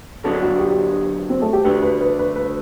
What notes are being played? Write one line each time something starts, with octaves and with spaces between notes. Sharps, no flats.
F#2 D3 F#3 B3 D4 A4
F#4
G4
C4
A3
G4
D2 D3 A3 D4 B4
B4
B4
B4
B4